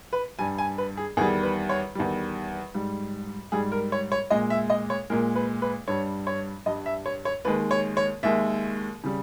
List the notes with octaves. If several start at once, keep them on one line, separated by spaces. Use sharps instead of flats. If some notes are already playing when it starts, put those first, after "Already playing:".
B4
G2 G3 G#5
G#5
B4
G#4
E2 D#3 G3 G#4
B4
C#5
E2 D#3 G3
G#2 G3
G#2 G3 G#4
A#4
C#5
C#5
A#2 G#3 D#5
E5
D#5
C#5
A#2 G#3 A#4
B4
B4
G2 G3 C#5
C#5
G2 G3 D#5
E5
C#5
C#5
D#2 D#3 G#3 B4
C#5
C#5
D#2 D#3 G#3 E5
C#3 G3